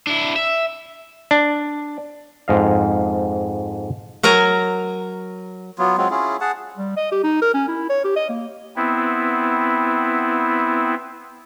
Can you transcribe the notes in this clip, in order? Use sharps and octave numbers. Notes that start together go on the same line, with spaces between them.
D4 E4
E5
D4
F2 G#2 D#5 F5
F#3 A#4 G#5 A#5
F#3 B3 F4
F#3 G#3 C4 F4
C#4 E4 F4 G#4
G#4 F#5 A5
G3
D#5
G4
D#4
A#4
C#4
E4
C#5
G4
D#5
A#3
B3 C4 E4